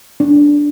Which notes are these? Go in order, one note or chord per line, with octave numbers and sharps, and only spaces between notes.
D4